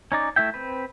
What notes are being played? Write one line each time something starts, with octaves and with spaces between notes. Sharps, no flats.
C#4 D#4 D5
A3 E4 E5 G5
C4 B4